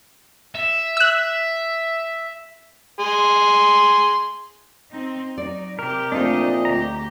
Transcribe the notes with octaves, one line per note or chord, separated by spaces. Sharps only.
E5
E6 F#6
G#4 C6
C4 D#4
F#3 D#4 D5
C3 G4 A#4
A#2 F3 A3 C4 D4 D#4 D#5
D2 G4 A#5